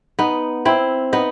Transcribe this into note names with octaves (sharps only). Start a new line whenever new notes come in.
B3 D#4
C4 E4
B3 D#4